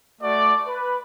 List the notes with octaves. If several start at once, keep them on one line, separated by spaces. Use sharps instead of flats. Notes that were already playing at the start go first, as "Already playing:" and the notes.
A3 F#4 D5
B4